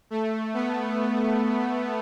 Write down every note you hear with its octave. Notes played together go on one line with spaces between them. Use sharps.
A3
B3